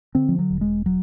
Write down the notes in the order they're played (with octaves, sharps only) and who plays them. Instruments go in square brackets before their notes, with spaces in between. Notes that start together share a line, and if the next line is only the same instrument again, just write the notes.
[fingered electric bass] D3 C4
F3
F#3
E1
G#3
F#3